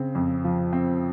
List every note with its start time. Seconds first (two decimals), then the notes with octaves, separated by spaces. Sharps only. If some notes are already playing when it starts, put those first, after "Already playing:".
Already playing: C#3 C4
0.15 F2
0.44 F3
0.73 C4